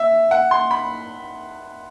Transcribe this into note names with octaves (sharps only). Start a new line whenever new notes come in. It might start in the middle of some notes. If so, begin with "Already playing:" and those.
Already playing: E5
F#5
C6
B5